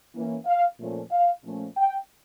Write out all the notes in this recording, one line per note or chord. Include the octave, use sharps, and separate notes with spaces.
E3 A#3 C#4
F5
A#2 F3 A3 C#4
F5
A#2 F3 A3 C#4
G5